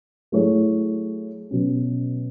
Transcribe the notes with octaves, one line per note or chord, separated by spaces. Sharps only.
F#3 A3 E4 G#4 C#5
B2 F#3 C#4